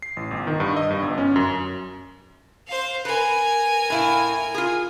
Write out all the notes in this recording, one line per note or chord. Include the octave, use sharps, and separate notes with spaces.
C7
A1
G1
D#3
G2
D#5
G2
G1
C#4
F#2
C5 F5
A#4 B4 G#5
A2 E4 F5
F4 G#4